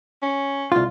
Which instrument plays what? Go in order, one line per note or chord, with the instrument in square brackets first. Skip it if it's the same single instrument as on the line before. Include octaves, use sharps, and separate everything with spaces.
[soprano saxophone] C#4
[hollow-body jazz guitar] C2 F4